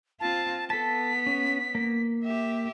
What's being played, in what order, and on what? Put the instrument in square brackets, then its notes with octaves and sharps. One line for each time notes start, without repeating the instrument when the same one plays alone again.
[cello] C4 F4 [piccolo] A5
[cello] B3 [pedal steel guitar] A4 A5 [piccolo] B6
[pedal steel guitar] C#4
A#3
[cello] G4 E5